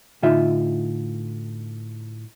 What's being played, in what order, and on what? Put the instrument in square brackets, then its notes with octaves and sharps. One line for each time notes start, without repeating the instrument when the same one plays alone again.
[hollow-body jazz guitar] A2 D3 D#4 F4 E5